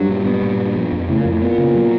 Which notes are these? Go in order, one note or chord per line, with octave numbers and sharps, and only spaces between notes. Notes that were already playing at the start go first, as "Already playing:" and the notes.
Already playing: G2 F#3
A#2
B3
A#2
B3
F3
F2
A2 C#3
A#2
F2
A2
A#2 B3
C#3
F#3